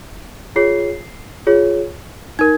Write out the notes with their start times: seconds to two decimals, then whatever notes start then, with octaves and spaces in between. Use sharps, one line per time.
0.56 F4 G#4 C#5 C7
1.47 F4 G#4 C#5
2.39 D#4 A#4 G#6